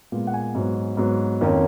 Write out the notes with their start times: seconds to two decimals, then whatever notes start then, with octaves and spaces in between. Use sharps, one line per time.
0.12 A#2 G#3 B3
0.27 F#5
0.34 G#5
0.55 G#2 F#3 B3
0.97 G#2 F#3 B3
1.41 F2 D#3 A#3 C#4